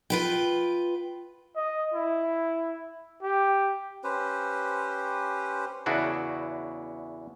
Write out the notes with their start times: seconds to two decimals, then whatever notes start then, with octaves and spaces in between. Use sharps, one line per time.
0.10 F4 B4 G5
1.56 D#5
1.94 E4
3.22 G4
4.04 C#4 G4 B4 C5
5.86 E2 C#3 D4 E4 F#4